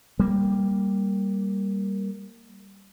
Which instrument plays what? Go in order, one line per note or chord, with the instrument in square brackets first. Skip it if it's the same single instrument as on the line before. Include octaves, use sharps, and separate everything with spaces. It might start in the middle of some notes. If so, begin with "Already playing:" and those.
[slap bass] G3 A#3